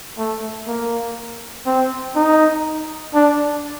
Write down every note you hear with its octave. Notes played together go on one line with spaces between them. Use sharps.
A3
A#3
C4
D#4
D4